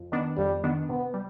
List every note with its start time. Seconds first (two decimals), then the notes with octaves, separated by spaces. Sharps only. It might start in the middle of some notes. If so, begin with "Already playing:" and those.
Already playing: F2
0.12 D#3 B3 D4
0.37 F2 G3
0.64 D#3 B3 D4
0.89 C3 B3
1.14 G3